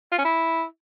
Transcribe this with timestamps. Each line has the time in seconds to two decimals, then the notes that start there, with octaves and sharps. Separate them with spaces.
0.12 F4
0.18 C#4
0.25 E4